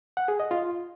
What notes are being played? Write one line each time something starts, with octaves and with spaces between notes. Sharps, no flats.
F#5
G#4
D#5
F4